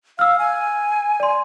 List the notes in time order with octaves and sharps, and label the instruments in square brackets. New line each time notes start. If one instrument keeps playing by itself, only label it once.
[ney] F5 [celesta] E6 F6
[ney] G#5
[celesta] D5 C6